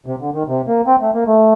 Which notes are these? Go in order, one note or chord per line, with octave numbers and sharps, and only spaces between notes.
C3
D3
D#3
C3
A#3
C4
A3
A#3
A3